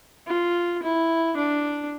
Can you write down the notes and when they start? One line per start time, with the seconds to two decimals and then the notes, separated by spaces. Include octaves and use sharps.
0.27 F4
0.83 E4
1.37 D4